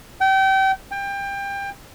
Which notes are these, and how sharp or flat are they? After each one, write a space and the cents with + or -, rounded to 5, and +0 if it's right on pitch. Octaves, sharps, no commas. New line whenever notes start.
G5 -30
G5 +25